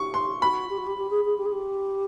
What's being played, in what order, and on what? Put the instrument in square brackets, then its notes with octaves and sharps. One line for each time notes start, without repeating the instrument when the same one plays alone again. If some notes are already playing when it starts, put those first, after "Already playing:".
Already playing: [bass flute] G4 [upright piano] C#6
[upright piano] C6
[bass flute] F#4 [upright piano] B5
[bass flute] G4
F#4
G4
G4
G#4
G#4
G4
G#4
G4